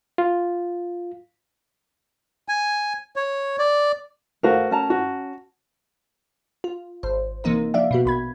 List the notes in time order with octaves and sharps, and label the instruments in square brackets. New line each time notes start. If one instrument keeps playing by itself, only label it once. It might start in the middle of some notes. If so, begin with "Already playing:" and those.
[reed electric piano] F4
[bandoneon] G#5
C#5
D5
[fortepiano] A3 F#4 A#4 [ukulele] C5 F5
[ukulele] C#4 A5 A#5
[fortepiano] F#4
[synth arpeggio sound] F4
G#1 C5
C3 E3 A#3 D#4 A#4
F3 D4 D5 E5 F5
B2 B3 F#4
A#1 B5 G#6